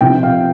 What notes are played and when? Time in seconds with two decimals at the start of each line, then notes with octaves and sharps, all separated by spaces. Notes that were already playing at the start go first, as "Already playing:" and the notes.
0.01 C3 F3 G5
0.23 F5